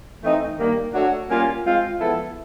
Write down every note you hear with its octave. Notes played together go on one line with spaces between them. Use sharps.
E3 A3 C4 D#4
G2 D#3 G3 A#3
A3 D4 F#4 A4 C#5
G3 A#3 C#4 F4
G#3 C4 F4
F3 G#3 B3 E4 A4